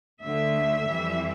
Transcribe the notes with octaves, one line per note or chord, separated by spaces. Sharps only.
D2 D3 A3 E5
F2 E3 G3